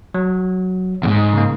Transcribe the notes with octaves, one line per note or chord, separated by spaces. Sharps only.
F#3
E2 G#2
C#3 A#3